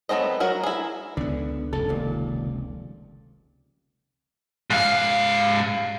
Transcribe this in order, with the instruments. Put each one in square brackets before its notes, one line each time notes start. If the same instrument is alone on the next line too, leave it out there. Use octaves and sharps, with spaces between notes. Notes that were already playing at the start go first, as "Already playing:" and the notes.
[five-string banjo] F#3 A3 B3 C4 D#5
F#3 F#4 A#4
E4 G#4
[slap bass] C#2 B3 [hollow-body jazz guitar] D3
[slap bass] F1 C#2 [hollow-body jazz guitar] A4
[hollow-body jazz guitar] D#2 A#2
[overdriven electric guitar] G#2 F5